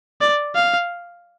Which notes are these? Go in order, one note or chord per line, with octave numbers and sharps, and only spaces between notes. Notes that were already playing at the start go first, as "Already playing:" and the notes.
D5
F5